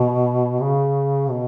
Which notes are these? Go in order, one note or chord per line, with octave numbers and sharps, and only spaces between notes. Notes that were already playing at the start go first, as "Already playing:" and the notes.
Already playing: B2
C#3
B2